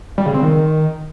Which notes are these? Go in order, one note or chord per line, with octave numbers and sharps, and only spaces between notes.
G3
C#3
C4
D#3